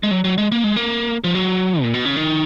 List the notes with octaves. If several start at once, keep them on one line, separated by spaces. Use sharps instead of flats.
G#3
F#3
F#3
G#3
A#3
G#3
A#3
F3
F#3
A#2
B2
C#3
D#3